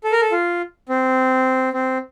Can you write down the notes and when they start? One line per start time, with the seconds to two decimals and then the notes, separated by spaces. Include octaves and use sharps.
0.04 A4
0.12 A#4
0.21 A4
0.32 F4
0.89 C4
1.73 C4